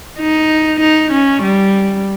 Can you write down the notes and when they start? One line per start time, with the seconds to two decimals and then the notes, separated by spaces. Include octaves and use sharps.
0.19 D#4
0.80 D#4
1.11 C#4
1.43 G3